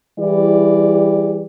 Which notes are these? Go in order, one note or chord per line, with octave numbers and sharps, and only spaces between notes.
E3 G3 E4 G4 G#4 D5